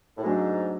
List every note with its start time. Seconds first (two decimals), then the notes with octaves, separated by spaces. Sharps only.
0.17 A2
0.23 G#2 F#3 A3 D4